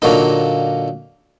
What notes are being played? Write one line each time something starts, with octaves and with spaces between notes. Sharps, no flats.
A#2 D3 F#3 A#3 D#4